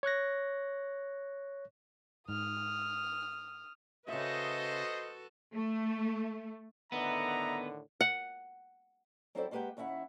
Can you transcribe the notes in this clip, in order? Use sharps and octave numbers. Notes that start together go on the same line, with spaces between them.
C#5 C#6 F#6 A#6
G#2 D#6 F6
C#3 F#4 A4 B4 C5 D#5 E5
A3
A2 D3 D#3 B3 B4 D#5 E5 A#5
F#5
F#3 C4 E4 A4 C5 D5
G#3 A#3 G4 B4 F#5 G5
D#2 C#4 E4 E5 F#5